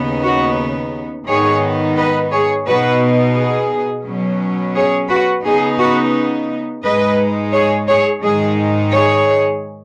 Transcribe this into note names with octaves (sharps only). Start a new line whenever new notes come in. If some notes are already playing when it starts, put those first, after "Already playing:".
Already playing: D#2 C#3 B3 D#4
F#4
G#2 D#3 B3 D#4 G#4 C#5
B4 D#5
G#4 C#5
B2 B3 D#4 F#4 B4
G#4
B2 F#3 C#4
G#4 C#5
F#4 B4
C#3 B3 D#4 G#4
F#4 B4
G#2 G#3 D#4 B4 D#5
G#4 C#5
G#4 C#5
G#2 D#3 G#3 D#4 G#4
G#4 C#5